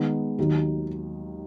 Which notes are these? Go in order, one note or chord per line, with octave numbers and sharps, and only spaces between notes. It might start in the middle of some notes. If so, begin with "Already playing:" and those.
Already playing: D#3 G#3 B3
D#2 D#3 F#3